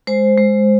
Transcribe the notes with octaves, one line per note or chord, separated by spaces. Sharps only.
G#3 C5
G#3